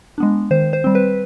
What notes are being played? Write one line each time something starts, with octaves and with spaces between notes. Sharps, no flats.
G#3 B3 D4
D#3 C5
C5
G3 C4
B4